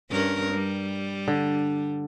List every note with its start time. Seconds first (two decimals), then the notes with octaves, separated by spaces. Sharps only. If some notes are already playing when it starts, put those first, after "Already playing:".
0.11 G2 C#4 A#4
0.54 G3
1.28 D3